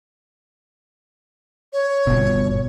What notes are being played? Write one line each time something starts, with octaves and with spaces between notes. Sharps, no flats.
C#5
G1 B2